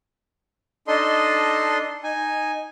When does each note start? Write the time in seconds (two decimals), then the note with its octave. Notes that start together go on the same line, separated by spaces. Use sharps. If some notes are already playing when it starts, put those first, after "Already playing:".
0.87 D4 D#4 A4 D#5 C6
2.04 D#4 G#5